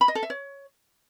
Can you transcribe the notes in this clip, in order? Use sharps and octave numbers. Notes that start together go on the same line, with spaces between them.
B5
D#5
A4
E5
C#5